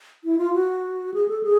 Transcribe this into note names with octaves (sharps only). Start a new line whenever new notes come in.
E4
F4
F#4
G#4
A4
G#4